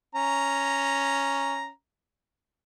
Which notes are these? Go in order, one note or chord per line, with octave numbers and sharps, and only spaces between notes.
C#4 A#5